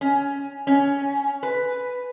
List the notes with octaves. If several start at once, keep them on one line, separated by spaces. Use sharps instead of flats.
C#4
C#4
B4